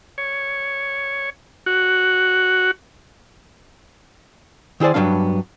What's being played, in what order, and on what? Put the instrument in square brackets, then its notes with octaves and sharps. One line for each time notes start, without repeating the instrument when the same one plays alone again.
[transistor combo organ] C#5
F#4
[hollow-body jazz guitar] D#3 E4 G#4 C5 D5
G2 D3 F#3 B3 D4 F5